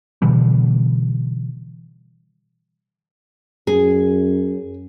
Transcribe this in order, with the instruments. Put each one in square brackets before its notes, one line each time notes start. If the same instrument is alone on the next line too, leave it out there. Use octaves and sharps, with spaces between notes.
[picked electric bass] B2 D3 E3 G3
[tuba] F#2 [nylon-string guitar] G#4